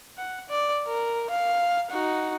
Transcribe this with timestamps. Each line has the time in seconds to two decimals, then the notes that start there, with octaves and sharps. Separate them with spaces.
0.18 F#5
0.49 D5
0.87 A#4
1.30 F5
1.91 D#4 F#4